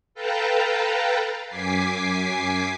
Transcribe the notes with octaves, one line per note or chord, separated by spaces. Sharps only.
A4 B4 F5 G5 A5 A#5
F#2 G#5 D6 B6 C7